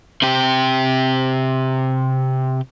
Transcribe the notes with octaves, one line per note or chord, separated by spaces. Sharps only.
C3 G4